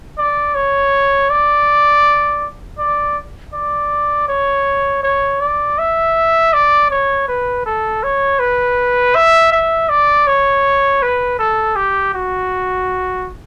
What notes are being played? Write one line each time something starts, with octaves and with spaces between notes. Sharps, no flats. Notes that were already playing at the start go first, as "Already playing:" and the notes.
D5
C#5
D5
D5
D5
C#5
C#5
D5
E5
D5
C#5
B4
A4
C#5
B4
E5
E5
D5
C#5
B4
A4
G4
F#4